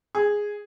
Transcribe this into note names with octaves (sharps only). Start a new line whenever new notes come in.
G#4